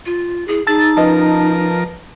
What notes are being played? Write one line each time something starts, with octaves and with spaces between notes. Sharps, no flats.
F4
E4 G#4
D#4 G#4 A5 E6 A6
F3 C#4 A#4 B4 D#5 A5